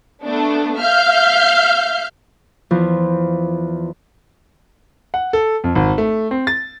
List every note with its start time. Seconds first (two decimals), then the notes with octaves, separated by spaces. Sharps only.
0.23 A3 B3 D4
0.80 E5 F5 F6 G6
2.71 E2 E3 F3 C5
5.14 F#5
5.33 A4
5.64 F2
5.75 G#1
5.98 A3
6.31 C4
6.47 A6